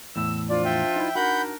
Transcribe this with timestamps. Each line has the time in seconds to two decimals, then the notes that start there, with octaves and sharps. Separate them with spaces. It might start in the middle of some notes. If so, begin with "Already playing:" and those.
0.16 E2 A2 E6
0.49 F3 D4 F4 D5
0.65 E5 G5
0.96 D#4 E4
1.15 D4 D#4 F#4 A#4 F#5 B5 G6